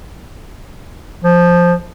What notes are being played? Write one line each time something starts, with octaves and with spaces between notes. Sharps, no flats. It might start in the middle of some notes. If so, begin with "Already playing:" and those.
F3